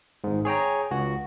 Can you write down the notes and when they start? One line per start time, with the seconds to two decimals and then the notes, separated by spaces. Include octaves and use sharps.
0.24 G#1 G#2
0.45 G#4 C#5 G5 A#5
0.91 C#2 F#4